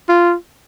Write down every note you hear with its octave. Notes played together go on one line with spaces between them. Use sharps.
F4